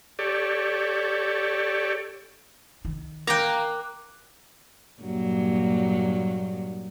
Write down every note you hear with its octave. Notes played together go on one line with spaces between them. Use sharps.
G4 A4 C#5 D5
D#3
A#3 G5 A#5 D6 F#6
G2 A#2 F#3